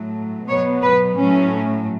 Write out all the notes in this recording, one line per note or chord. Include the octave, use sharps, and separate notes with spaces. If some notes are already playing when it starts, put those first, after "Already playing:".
Already playing: A2 F#3 A3
B2 F#3 B3 C#5
B4
A2 F#3 A3 C#4